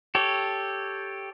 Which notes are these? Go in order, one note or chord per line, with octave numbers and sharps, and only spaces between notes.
G4 A4 C#5